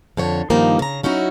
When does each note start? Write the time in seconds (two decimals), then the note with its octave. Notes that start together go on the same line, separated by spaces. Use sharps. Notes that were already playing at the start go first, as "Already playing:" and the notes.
0.17 F2 D3 C#5
0.50 G2 D#3 F3 A#3 D#4
0.79 C#3 A#5
1.03 F#3 C#4 D#4 E4 F#4